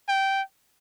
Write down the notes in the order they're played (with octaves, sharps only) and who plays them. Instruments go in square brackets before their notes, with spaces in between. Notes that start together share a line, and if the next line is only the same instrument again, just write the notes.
[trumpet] G5